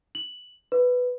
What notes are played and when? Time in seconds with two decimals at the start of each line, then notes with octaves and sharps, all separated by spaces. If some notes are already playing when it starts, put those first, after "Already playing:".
0.15 F#7
0.72 B4